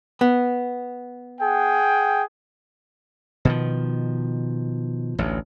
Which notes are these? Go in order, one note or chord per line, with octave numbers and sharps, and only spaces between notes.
B3
G#4 F#5 G5
B2 D#3 F3
A1 D2